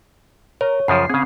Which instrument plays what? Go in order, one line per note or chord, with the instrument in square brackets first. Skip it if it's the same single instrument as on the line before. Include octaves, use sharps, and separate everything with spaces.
[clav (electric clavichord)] A#4 [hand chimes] C#5
[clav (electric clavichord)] F#2 C#3 F3 [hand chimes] C7
[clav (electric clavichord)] C#3 G#4 [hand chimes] C4